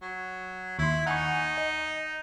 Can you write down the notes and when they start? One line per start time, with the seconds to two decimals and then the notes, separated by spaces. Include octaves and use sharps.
0.02 F#3
0.79 D#2 E4 C6
1.06 D#4 F#5 G#5 C#6
1.58 D#5